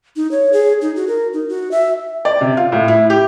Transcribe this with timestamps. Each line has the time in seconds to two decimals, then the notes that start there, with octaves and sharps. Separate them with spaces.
0.16 D#4
0.31 C#5
0.53 G#4
0.82 D#4
0.96 F#4
1.08 A#4
1.33 D#4
1.49 F#4
1.71 E5
2.25 D5
2.41 C3
2.57 F4
2.72 A2
2.88 E4
3.10 G4